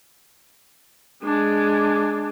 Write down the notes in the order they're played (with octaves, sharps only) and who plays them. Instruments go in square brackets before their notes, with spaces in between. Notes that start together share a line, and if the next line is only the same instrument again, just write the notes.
[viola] G#3 D4